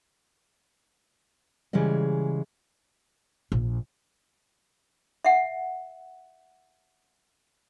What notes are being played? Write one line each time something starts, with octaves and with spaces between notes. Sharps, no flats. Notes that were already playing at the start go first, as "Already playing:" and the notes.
C#3 E3 G3 G#3 D#5
A#1
E5 F#5